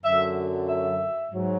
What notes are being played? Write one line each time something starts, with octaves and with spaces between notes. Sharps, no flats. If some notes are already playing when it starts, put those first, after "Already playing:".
F#2 D3 F#3 E5
E5
G#2 F#3